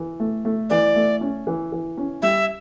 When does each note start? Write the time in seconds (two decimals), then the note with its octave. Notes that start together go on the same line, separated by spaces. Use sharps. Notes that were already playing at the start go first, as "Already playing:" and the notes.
Already playing: E3
0.20 A3
0.45 A3
0.70 E3 D5
0.96 A3
1.21 C#4
1.47 E3
1.72 E3
1.97 C#4
2.22 G3 E5